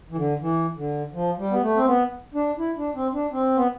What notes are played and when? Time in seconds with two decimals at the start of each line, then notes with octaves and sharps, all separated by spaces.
0.11 E3
0.17 D3
0.41 E3
0.77 D3
1.14 F3
1.38 G3
1.50 B3
1.62 A3
1.76 C4
1.86 B3
2.34 D4
2.58 E4
2.77 D4
2.95 C4
3.14 D4
3.32 C4
3.57 B3